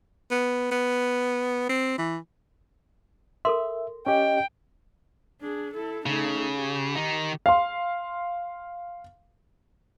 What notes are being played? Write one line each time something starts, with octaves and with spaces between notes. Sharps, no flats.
B3
B3
C4
E3
A4 A#4 E5 C6
C#4 G4 D#5 G5
D4 G#4
E4 A4
C#3 A3 D#4
G4
D#3 D#4
F5 C6